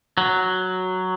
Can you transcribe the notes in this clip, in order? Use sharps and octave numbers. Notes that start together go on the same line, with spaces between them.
F#3